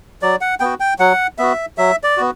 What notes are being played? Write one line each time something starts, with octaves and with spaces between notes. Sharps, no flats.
F#3 D5
F#5
B3 F#4 G5
G5
F#3 F#5
B3 F#4 E5
F#3 E5
D5
B3 F#4